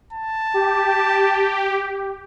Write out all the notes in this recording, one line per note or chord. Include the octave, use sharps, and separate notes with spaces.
A5
G4